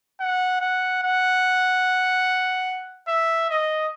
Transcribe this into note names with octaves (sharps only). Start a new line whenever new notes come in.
F#5
F#5
F#5
E5
D#5